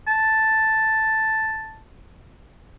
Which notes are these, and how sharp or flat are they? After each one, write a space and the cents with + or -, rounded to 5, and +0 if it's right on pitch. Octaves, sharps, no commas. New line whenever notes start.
A5 +0